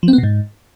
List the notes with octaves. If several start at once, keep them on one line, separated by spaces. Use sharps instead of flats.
F3
C4
B3
B2
G#2